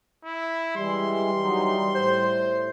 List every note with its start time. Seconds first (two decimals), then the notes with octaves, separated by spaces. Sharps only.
0.25 E4
0.76 E3 G3 G#3 C6
1.40 E3 F#3 D#4
1.95 A2 C5